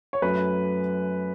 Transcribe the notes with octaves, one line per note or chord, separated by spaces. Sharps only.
C#5
F#2 F#3 A3 C#4 B4